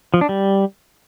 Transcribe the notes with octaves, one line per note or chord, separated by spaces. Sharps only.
F3
D4
G3